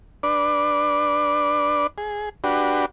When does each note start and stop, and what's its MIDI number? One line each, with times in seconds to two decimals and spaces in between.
0.23 1.87 62
0.23 1.87 71
0.23 1.87 74
1.98 2.29 68
2.44 2.86 62
2.44 2.86 66
2.44 2.86 67
2.44 2.86 71